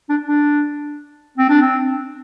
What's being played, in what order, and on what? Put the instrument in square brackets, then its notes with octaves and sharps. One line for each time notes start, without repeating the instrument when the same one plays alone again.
[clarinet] D4
D4
C4
D4
C4